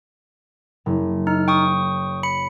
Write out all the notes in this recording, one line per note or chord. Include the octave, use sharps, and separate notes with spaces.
F#1
D#4 F6
G5 C#6 D#6
B5 C#7